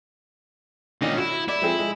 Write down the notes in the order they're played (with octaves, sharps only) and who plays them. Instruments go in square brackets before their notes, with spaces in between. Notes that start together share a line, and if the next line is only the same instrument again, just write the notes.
[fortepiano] A#2 D#3 D4 [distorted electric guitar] C#4 D#5
[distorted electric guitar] E4 [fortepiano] F#4
[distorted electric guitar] E4 [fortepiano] D5
[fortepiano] F3 C4 G#4
G#3